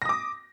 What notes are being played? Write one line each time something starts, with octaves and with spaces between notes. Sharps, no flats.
D6 D#6 A#6